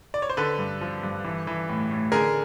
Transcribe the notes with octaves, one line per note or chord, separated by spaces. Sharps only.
D5
C#5
C5
D3 A4 B4
G2
F3
G2
E3
E3
A2
A2
D3 G#4 A#4